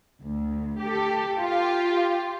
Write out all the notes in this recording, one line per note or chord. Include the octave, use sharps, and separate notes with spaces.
D2
G4 A4
F4 G4